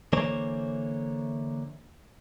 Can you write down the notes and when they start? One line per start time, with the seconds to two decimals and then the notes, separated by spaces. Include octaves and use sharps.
0.13 D3 E3 A#3 C5 C#5